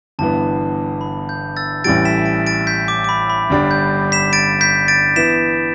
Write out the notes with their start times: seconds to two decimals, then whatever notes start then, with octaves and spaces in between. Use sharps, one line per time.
0.19 G1 G2 E3 B3 A5
1.01 B5
1.29 G6
1.57 E6 A6
1.84 A1 A2 E3 G3 A6 D7
2.05 B6 E7
2.25 A6 D7
2.47 A6 D7
2.67 G6 B6
2.88 D6
3.04 D6
3.09 B5
3.30 B5
3.50 G1 G2 G3 D4
3.71 G6
4.12 B6 E7
4.33 A6 D7
4.61 G6 B6
4.88 A6 D7
5.16 E3 B3 B6 E7